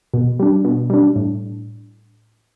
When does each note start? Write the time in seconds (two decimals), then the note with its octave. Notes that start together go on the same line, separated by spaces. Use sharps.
0.14 B2
0.40 G3 D4
0.65 B2
0.90 G3 D4
1.16 A2